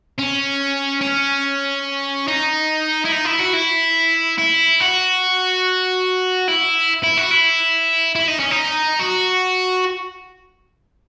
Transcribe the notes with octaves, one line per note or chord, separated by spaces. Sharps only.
C#4
C#4
D#4
E4
D#4
E4
F#4
E4
E4
F#4
E4
E4
F#4
E4
E4
D#4
C#4
D#4
F#4